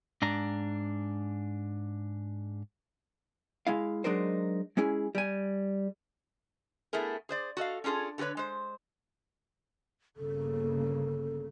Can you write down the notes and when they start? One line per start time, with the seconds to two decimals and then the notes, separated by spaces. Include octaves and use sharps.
0.22 G#2 D4 A#5
3.67 G#3 E4 F5
4.04 F#3 G#3 D4 D#4 A#4 C5
4.77 G#3 C#4 E4 G#4
5.15 G3 G#5
6.93 A3 B3 E4 G#4 A#4
7.29 G#4 C5 D5
7.57 F#4 A4 D#5 F5
7.84 C#4 D4 F4 G#4 A4
8.18 D3 F#4 G#4 B4 C#5
8.37 G#3 C5
10.16 G1 C#3 A#3 A4